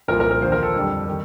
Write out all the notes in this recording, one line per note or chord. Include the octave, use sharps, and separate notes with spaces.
C2 A#2 F3 A#4
A#4
A#4
D#2 D3 F3 C5
A#4
A4
F2 D3 G3
D#3 G3